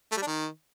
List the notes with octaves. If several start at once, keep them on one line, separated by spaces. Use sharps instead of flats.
A3
G3
D4
D#3